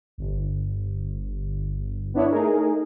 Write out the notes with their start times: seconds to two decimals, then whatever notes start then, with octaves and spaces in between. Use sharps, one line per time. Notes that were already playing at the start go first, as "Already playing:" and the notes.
0.18 G1
2.14 B3 D4 E4 C#5
2.30 A3 D#4 G#4 A#4